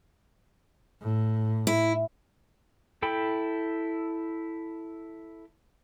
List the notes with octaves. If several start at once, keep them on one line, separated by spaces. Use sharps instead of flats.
A2
E4
E4 A4 G5 B5